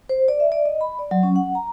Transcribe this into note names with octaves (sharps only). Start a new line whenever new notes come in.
C5
D5
E5
D5
D#5
B5
D5
F#3
C#4
F#5
A#5